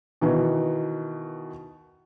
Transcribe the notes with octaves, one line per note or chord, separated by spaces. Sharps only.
B2 D#3 E3